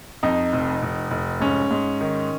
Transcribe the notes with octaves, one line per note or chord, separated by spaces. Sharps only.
F2 D#4
F1
F1
F1
G#2 C#4
G#2
D#3